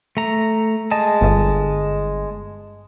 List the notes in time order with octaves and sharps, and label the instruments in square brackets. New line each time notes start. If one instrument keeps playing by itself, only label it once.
[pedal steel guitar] A3 A#5
G#3 D#5 A5
[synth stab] G1